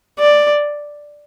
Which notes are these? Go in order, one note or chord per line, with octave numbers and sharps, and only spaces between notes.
D5